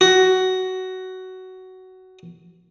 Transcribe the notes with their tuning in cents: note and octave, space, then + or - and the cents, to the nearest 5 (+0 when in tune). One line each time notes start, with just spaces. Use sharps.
F#4 +15